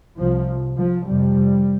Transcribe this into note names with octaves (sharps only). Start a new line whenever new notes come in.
C2 C3 F3
F3
F2 C3 G3